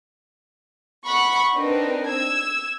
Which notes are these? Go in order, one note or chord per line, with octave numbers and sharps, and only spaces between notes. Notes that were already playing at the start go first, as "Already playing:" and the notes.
F#5 B5 C#6
C4 D4 D#4 A#4 B4
E6 G#6